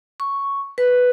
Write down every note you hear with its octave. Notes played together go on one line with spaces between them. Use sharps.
C#6
B4